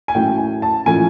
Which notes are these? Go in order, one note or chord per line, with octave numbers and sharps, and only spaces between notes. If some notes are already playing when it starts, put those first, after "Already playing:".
G#5
A2 F#3 A3 C#4 G5
G#5
A5
A2 F3 A3 C#4 G#5